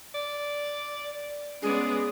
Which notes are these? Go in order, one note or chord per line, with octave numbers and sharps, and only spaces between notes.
D5
G#3 B3 C#4 G#4 D5